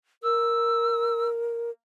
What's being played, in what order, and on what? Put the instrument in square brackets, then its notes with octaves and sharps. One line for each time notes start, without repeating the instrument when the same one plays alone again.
[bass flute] A#4 [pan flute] E6